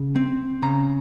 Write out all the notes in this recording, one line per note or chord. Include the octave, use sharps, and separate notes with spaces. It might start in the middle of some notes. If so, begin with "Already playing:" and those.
Already playing: C#3
C4
C#3 A#5